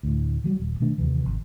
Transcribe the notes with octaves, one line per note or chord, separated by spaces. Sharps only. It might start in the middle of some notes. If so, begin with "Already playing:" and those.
D2 A2
E3 F#3 G3
D#1
B2 D#3 A3 D4
D#2 C3 E3
G#1